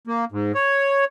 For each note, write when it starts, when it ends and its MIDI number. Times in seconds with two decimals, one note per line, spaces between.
0.07 0.25 58
0.32 0.52 44
0.55 1.04 73